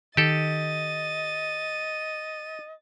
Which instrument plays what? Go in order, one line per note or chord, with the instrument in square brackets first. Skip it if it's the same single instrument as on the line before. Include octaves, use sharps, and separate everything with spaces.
[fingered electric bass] D#3 [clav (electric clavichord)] G4 A4 [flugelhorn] D#5 [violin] A6 D#7